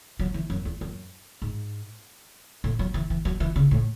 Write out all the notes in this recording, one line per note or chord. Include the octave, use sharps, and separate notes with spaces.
F#3
E3
F#2
E2
F#2
G#2
A2
F#3
E3
E3
F#3
E3
C#3
A2